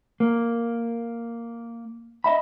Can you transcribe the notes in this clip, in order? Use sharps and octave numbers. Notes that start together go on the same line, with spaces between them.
A#3
D#5 E5 B5